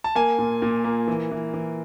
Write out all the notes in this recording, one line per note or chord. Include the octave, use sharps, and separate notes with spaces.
A5
A#3 G#5
A#2
A#2
A#3
E3
E3
E3